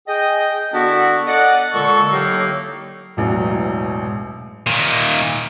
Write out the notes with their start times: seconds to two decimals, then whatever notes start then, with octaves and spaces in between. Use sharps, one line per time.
0.08 G#4 D#5 G5
0.73 D3 B3 D4 E4 F#4
1.27 A4 D5 D#5 F#5
1.74 A#2 D3 G#3 A4 C#6
2.12 A2 D3 F#3 A#3 D#4 G4
3.17 E1 A1 F#3
4.67 A#2 D#3